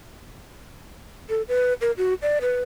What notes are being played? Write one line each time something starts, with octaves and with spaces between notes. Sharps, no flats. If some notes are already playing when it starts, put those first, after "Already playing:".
A4
B4
A#4
F#4
D5
B4